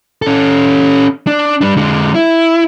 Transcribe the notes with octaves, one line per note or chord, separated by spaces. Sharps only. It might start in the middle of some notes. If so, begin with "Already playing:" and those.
C#4 A4
D4
G3 D4
D3 G#3
E4